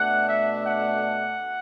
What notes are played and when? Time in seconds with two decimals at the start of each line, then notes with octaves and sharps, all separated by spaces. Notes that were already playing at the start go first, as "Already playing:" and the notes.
Already playing: B2 A3 D4 F#5
0.28 E5
0.65 F#5